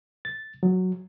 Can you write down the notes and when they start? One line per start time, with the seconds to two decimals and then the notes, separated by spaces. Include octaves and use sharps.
0.25 A6
0.63 F#3